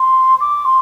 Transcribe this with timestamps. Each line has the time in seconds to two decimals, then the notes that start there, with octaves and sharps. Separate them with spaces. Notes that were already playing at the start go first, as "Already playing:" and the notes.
Already playing: C6
0.41 D6
0.65 C6